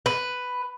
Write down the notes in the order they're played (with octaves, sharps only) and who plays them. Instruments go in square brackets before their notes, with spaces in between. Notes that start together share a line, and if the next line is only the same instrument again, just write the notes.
[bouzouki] B4